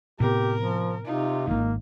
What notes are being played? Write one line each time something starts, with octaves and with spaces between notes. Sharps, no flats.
A2 C3 B3 G4 A#4
F3
C3 D#4 F4
D#1 G#1 A#3